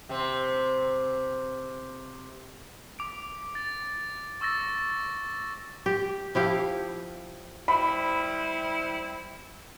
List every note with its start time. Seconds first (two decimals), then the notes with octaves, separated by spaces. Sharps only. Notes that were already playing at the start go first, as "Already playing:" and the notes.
0.09 C3 C4
2.99 D6 D7
3.55 A6
4.41 C#6 E6 A6 A#6
5.86 G4
6.35 F3 E4 G4 F5
7.68 G3 E4 C5 B5